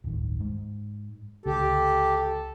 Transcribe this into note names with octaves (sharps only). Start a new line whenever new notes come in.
D1 G1 D#3
G#2
C#2 D3 G4 A4